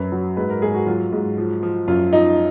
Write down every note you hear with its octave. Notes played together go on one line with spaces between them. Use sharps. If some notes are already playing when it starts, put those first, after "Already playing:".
Already playing: F#2 B4
F#3
G#2 B4
A#4
G#2 G#4
F#4
F#3 F4
G#2
F3
F3
F#2 F4
F3 D#4